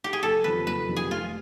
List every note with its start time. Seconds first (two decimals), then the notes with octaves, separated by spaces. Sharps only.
0.04 G4
0.13 G#4
0.23 F#1 A4
0.44 F2 C3 D#3 G3 B4
0.67 F#1 B4
0.89 F2 C3 D#3 G3
0.96 G#4
1.11 F1 F4